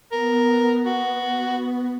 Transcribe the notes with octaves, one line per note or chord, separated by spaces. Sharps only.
B3 A#4
F#4